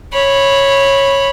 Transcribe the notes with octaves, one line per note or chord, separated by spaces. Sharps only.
C#5 B5